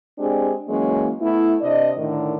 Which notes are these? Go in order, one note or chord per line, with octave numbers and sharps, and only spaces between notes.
G#3 C4 D4 G4 G#4
E3 F#3 G#3 A#3 C#4
A3 B3 E4
C3 D4 D5 D#5
A2 D3 D#3